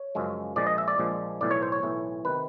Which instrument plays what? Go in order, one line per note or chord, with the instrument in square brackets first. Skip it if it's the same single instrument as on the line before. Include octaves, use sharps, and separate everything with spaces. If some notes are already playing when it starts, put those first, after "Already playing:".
Already playing: [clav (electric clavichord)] C#5
F#2 C#3 F3 G#3
A#1 A#2 F3 G#3 D5
D#5
E5
D5
A#1 A#2 F3 G#3
B1 A2 E3 D5
C#5
C5
C#5
B1 A2 E3
C3 D#3 B4